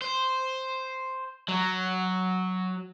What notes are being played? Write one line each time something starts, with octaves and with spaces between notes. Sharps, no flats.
C5
F#3